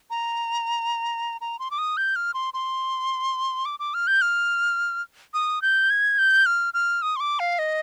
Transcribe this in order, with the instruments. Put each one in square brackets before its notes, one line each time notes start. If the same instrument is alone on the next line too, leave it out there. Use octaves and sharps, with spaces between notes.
[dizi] A#5
A#5
C6
D6
D#6
G6
F6
C6
C6
D6
D6
F6
G6
F6
D#6
G6
G#6
G6
F6
F6
D#6
C6
D6
F5
D#5